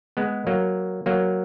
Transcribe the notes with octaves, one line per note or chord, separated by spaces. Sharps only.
G#3 B3
F#3 A#3
F#3 A#3